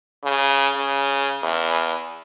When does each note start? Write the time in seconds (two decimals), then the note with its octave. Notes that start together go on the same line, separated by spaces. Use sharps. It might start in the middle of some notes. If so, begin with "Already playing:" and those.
0.24 C#3
0.76 C#3
1.43 E2